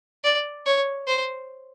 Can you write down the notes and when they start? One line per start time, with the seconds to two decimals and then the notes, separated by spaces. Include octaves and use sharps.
0.24 D5
0.66 C#5
1.08 C5